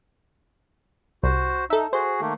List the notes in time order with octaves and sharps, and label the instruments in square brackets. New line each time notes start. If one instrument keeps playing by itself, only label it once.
[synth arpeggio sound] C2 [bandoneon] F#4 C5
[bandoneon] D#4 [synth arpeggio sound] A4 E5
[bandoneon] F#4 G#4 [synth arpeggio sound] C5
[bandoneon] D#3 A3 A#3